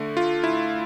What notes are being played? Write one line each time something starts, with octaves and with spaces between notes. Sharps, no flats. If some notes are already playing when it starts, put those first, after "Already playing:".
Already playing: D3 A3
F4
E4